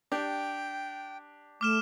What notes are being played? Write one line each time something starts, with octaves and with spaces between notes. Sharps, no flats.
D4 G4 G5
A3 D6 F6 E7